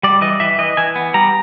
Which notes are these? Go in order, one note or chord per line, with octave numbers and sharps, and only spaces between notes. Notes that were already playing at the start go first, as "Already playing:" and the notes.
G3 D5
E3 D#5
E3 E5
E3 D#5
E3 G#5
B3
G3 A#5